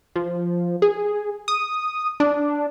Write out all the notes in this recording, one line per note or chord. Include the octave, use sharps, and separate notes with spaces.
F3
G#4
D#6
D4